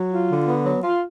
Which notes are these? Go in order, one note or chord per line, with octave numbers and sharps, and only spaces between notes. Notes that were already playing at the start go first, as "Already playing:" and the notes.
Already playing: F#3
F4
D3
B3
F#3
F4